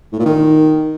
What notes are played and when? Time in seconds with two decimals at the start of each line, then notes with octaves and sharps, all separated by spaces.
0.13 A2
0.19 A#2
0.25 D#3